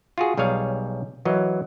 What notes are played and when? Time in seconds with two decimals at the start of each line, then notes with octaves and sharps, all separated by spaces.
0.18 F4 F#4 G#4
0.37 B1 G3 G#4 C#5 F5 G#5
1.25 E3 F#3 A#4 D#5